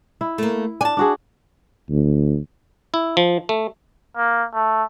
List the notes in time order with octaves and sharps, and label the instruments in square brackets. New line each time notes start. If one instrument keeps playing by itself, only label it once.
[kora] E4
[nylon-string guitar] A3 A#3
[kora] D4 [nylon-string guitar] G#5 A5
[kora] D4 F#4 G#4
[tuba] D2
[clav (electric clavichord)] E4
F3
A3
[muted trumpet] A#3
A3